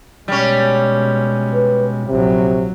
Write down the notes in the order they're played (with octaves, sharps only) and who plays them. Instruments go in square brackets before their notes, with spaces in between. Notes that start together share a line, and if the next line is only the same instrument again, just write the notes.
[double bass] B2 G#3 [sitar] G3 C#4
[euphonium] B4
[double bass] A#1 F#3 [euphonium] C3